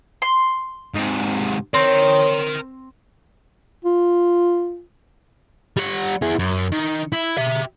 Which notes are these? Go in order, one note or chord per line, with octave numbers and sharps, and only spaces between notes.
C6
G#2 C3
C4 A#4 C#5 G5
F4
G3 F#5
E4 G#4
F#2
D#3
E4
G4 E5